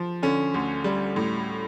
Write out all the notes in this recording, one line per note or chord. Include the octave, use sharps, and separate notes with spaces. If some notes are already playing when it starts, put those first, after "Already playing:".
Already playing: F3
D3 C#4
D2
G3
A2